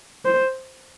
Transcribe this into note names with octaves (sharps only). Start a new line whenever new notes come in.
C5